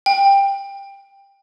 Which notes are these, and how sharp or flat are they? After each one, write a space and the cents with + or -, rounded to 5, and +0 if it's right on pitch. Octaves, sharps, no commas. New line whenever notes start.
G5 +15